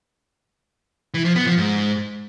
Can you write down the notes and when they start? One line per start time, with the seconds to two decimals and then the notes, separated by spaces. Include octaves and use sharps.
1.14 E3
1.25 F3
1.36 B3
1.47 F3
1.58 G#2